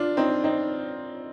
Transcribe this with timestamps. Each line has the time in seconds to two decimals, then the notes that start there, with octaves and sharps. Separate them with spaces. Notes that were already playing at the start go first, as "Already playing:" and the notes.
Already playing: D4 F4
0.17 C4 D#4
0.44 C4 D#4